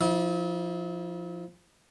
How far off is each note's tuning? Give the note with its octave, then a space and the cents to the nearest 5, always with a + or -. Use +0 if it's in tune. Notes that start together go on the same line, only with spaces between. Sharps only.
F3 +0 E4 -40